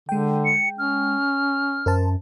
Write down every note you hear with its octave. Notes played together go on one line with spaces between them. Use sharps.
D3 G#3 G5
C#7
C#4 F6
F#2 A#4 C5 A5